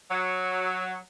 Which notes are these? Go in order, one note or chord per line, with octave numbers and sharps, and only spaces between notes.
F#3